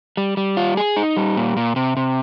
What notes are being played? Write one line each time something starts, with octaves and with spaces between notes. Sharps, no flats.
G3
G3
F4
G#4
D#4
G3
A#2
A#2
C3
C3